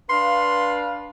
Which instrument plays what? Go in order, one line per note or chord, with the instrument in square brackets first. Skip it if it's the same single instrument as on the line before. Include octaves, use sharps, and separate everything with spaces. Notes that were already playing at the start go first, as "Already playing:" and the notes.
[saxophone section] D4 B4 F5 [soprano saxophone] C6